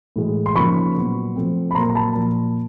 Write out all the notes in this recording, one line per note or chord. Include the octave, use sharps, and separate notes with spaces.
A2 E3 G#3
C6
C#3 F3 A#3 D#4 B5 C#6
A#2 F#3 B3
F3 A3 C4
B5
A#2 F#3 A#3 A#5 C6
A#5
A5 B5
A#2 F3 A#3